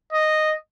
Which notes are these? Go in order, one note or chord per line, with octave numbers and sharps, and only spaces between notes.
D#5